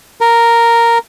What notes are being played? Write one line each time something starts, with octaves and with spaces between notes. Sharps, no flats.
A#4